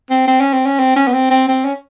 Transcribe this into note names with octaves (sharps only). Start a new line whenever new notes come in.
C4
C4
C#4
C4
C#4
C4
C#4
B3
C4
C4
C4
C#4